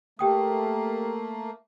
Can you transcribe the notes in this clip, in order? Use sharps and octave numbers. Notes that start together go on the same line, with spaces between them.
A3 A#3 G4 G5 D#6